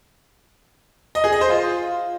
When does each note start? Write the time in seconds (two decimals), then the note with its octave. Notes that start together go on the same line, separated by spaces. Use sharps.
1.15 D#5
1.24 G#4
1.32 D#5
1.41 C5
1.50 F4